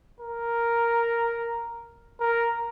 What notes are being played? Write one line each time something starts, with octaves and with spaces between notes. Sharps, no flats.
A#4
A#4